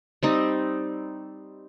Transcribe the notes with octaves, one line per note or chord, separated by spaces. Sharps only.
G3 C4 D#4